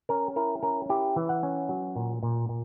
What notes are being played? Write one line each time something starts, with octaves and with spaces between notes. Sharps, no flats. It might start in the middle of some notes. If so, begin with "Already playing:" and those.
C#4 A#4
E4 A#4
C#4 A#4
E4 G4
E3
F#5
C#4
F#3
A#2
A#2
A#2